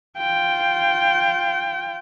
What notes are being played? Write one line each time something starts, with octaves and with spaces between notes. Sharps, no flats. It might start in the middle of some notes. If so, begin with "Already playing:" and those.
F4 G5